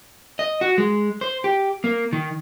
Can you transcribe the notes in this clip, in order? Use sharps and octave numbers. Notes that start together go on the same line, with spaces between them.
D#5
F#4
G#3
C5
G4
A#3
D#3